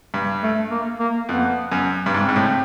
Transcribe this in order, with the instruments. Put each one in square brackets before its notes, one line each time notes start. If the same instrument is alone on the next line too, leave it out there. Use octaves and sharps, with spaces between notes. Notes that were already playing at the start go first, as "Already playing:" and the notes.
[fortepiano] G2
[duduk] A3
A#3
A#3
[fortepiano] F2 [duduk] B3
[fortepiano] F#2
G2
[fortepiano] G#2 [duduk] C4
[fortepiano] G#2
A2